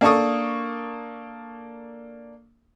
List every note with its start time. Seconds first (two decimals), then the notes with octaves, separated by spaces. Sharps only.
0.01 A#3 D4 A4 C#6 D#6